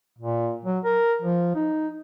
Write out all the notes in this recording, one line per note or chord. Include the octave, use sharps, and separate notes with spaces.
A#2
F#3
A#4
F3
D#4